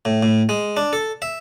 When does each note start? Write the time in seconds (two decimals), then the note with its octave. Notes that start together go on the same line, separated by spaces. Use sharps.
0.05 A2
0.23 A2
0.49 G#3
0.77 D4
0.93 A4
1.22 E5